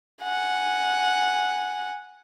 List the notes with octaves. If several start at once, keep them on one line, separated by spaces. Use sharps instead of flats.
F#5 G#5